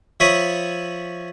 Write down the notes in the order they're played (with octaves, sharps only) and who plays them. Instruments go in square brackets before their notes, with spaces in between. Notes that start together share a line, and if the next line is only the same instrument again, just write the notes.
[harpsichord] F3 C#5 E5 B5 C#6 D#6